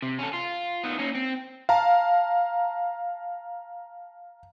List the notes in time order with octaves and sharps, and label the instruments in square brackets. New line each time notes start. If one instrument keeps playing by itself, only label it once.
[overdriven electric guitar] C3
C#4 A4
F4
D#3 B3
A#3 C#4
C4
[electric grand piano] F5 A5 A#5